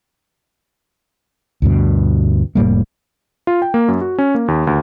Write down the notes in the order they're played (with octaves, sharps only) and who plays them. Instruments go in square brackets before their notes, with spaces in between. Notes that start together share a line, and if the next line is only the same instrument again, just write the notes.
[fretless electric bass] D2 G2 B2
F1 A2 G3 A#3
[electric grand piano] F4
G5
A#3
F#2
F#4
C#4
A#3
D#2
D2